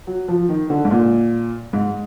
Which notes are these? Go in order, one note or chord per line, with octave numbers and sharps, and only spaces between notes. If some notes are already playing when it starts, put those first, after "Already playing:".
F#3
F3
D#3
D3
G#2
A#2
G#2